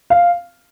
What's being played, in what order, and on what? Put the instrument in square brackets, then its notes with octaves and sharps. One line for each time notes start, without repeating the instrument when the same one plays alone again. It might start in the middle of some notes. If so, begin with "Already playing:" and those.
[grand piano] F5